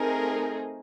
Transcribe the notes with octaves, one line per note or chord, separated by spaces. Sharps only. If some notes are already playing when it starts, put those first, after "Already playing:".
Already playing: A3 C4 D#4 G#4 A#4